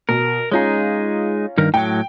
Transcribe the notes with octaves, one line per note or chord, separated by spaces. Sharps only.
B2 A#4
G#3 C#4 D#4 F4 G#4 A#5
G2 D#3 A#4
A2 F#3 G5